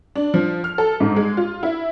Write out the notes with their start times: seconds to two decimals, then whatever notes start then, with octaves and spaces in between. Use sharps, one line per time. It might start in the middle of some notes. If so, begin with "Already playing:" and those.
0.16 D4
0.34 F3
0.64 F6
0.78 A4
1.00 G#2
1.16 G#3
1.37 F4
1.63 E4